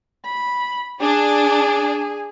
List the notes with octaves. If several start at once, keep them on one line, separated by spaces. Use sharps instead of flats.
B5
D4 G#4